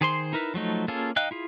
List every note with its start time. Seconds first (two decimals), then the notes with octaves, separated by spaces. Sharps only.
0.01 D#3 G#4 C5 C6
0.33 D#4 E4 A#4 B4
0.54 F3 F#3 A3 D#4
0.88 A#3 C#4 F4 G#4 A4
1.16 D#4 D#5 F5 G5 F#6
1.31 E4 F4 G#4